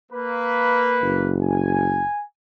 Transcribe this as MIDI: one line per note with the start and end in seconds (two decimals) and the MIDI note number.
0.12 1.35 58
0.12 1.35 71
1.02 2.03 30
1.44 2.24 80